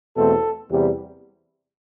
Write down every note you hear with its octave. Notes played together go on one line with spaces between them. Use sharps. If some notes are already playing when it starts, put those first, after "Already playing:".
E2 B2 A3 C4 A4
E2 C3 G3